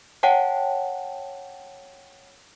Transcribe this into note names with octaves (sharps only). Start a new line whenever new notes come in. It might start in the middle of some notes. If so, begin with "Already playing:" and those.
C#5 F#5 G5 A5